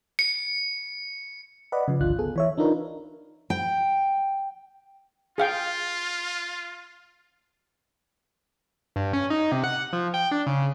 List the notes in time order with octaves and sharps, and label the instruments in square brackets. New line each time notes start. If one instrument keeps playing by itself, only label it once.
[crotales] C#7
[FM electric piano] B4 D5 D#5 F#5 B5
C#3 F3
G#1 D2 D3 F4 F#6
B3 G#4 A4
E3 C#5 E5
D4 D#4 F4 A#4 B4
[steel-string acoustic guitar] G5
[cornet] F4 [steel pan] G#4 F5 G5
[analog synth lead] G2
C#4
D#4
C3
F#5
F3
G5
D4
C#3